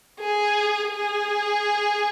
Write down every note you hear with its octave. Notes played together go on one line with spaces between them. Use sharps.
G#4
G#4